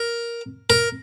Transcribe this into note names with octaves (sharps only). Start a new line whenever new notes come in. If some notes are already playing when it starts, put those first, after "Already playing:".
Already playing: A#4
A#4